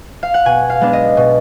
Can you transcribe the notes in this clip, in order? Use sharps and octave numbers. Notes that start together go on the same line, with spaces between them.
F5
F#5
B2 G#5
F5
G#3 B3 D4
D#5
B2